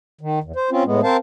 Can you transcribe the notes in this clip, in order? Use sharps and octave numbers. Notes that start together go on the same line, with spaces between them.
D#3
E2
C5
C4 C#4 F4
A2 G#3 B3
C4 A#4 C5 F5 A5